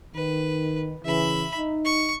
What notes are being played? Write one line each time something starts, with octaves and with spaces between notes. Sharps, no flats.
D#3 B4
C#3 E3 E5 B5
D#4
C#6